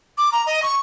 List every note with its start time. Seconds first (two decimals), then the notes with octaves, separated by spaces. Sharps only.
0.18 D6
0.32 A#5
0.46 D#5
0.63 C#6